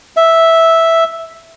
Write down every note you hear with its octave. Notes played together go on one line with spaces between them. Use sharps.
E5